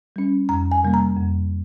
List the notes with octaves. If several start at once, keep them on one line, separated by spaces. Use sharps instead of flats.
G3 C#4
F2 A#5
G#5
C3 G3 A#3
A#5
F2